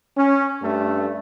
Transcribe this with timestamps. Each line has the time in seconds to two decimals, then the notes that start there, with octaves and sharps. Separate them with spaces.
0.17 C#4
0.62 G2 A3